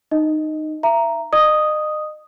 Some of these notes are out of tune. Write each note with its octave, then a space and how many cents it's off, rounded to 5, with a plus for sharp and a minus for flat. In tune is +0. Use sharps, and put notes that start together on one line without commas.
D#4 -15 D#5 +5
E5 +30 A#5 +0
D#5 -35 D#6 +0